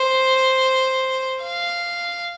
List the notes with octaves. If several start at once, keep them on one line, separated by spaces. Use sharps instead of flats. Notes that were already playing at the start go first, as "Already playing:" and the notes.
Already playing: C5
F5